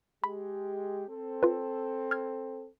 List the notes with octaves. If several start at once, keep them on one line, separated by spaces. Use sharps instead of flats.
G#3 G4 B5
C4 A4
F4 B4
F6 G#6